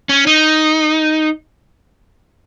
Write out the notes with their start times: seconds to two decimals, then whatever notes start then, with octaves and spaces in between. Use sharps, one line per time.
0.09 C#4
0.27 D#4